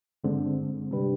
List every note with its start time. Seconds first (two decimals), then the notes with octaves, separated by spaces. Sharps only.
0.24 G2 D3 G#3 C4
0.91 C3 G3 D4 G4 B4